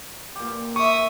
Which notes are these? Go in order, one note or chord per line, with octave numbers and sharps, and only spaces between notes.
A#2 G4
G4 E5 C#6 D#6